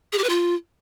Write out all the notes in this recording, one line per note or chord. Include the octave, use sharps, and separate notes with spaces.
G#4
G4
B4
F4